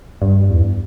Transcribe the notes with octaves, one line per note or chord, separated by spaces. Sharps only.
G2
E2